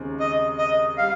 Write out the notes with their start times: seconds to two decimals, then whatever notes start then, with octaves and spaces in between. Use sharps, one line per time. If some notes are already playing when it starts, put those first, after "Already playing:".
Already playing: D#2 C#3 G#3 C4 D#4
0.20 D#5
0.58 D#5
0.98 G3 F5